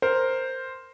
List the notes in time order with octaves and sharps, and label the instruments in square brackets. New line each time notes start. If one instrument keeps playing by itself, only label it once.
[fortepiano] A#4 [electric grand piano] C5